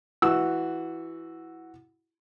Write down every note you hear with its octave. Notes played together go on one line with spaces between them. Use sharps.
E3 F#4 E6